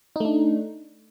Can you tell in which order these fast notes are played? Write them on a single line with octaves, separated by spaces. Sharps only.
D#4 A3 D4